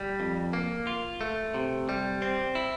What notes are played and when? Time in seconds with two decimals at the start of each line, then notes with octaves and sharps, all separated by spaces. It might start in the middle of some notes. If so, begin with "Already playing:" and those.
Already playing: G3
0.20 F2
0.53 A#3
0.87 F4
1.21 A3
1.54 C3
1.89 G3
2.22 C4
2.55 E4